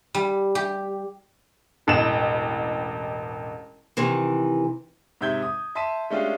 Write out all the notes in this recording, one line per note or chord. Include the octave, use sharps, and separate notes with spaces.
G3
G4
E1 A1 D#5 E7
C3 D#3 E3
G#2 C3 E5 G6 G#6 G7
D#6
E5 A5 C6 B6 D#7 E7
G#3 A3 C#4 D4 F4 G4